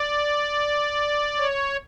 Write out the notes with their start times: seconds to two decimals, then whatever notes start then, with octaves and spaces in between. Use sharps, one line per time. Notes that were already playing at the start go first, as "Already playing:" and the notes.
Already playing: D5
1.37 C#5